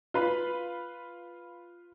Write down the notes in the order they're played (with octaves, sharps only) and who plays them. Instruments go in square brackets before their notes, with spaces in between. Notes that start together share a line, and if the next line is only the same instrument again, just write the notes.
[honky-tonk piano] F4 B4 B5